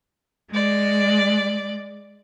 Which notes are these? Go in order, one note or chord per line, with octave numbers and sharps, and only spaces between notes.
G#3 D5